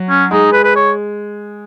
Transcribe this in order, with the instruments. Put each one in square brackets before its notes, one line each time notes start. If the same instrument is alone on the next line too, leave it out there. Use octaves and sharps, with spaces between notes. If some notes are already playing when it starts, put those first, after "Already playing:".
Already playing: [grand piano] F#3
[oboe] C#4
[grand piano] G#3 [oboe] D#4
[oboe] B4
B4
C#5